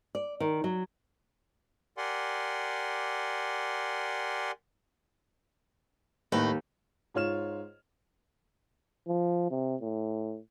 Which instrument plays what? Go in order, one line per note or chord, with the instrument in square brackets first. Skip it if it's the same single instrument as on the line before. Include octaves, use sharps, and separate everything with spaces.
[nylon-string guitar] D5
D#3
F#3
[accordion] G4 A#4 D5 F#5 G#5 C6
[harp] D#2 [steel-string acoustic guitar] A2 B4 D#5
[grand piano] G#2 F4 C#5 F6 E7
[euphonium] F3
C3
A2